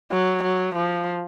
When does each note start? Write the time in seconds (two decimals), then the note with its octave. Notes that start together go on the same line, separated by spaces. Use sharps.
0.11 F#3
0.43 F#3
0.75 F3